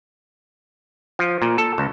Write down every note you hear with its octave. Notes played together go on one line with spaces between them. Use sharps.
F3
A#2
A4
C#2